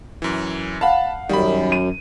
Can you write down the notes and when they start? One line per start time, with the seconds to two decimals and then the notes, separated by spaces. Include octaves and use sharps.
0.22 F#2 E3
0.81 F5 F#5 A5 B5
1.29 F#2 D#3 G3 B5
1.72 D#7